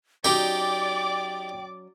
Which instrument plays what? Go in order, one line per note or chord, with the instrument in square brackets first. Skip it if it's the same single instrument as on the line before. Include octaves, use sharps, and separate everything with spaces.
[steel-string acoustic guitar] F#3 C#4 [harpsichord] D#4 G4 [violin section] D5 D6 [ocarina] G5